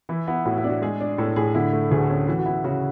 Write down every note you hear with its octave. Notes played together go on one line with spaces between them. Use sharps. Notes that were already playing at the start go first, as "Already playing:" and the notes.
E3 E4
B3 E4
A2 F#4
E4
D4
F#4
G#3 G#4
D4
A2 A4
A2 G#4
D3 E4
A3
D2 G#4
A4
C#4
E3 F#4
F#4
B3 E4
C#3 F#4